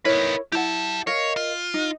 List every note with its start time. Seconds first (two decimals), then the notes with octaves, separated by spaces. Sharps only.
0.05 D#4 E4 A#4 B4 C#5
0.52 E4 G4 F#5 A5
1.07 A#4 C#5 D#5 F5
1.37 F4
1.74 D#4